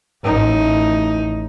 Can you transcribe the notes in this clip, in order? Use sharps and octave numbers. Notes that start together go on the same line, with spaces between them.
A1 D#4